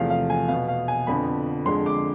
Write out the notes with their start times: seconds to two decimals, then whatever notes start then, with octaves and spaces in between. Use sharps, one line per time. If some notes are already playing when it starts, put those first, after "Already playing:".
Already playing: E2 C3 F3 A3 F5
0.10 F5
0.30 G#5
0.48 B2 B3 F5
0.68 F5
0.88 G#5
1.07 F2 D3 F3 B3 B5
1.66 F2 D3 G#3 C6
1.86 D6